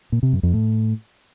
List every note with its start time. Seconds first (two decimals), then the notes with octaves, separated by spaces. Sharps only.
0.12 A#2
0.23 C3
0.33 F#2
0.43 F2
0.53 A2